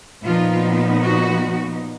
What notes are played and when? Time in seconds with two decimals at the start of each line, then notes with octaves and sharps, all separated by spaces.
0.24 A#2 F3 B3 D#4 F4
1.02 F#4